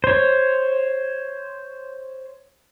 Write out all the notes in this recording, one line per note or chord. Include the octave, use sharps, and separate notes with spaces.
C5 C#5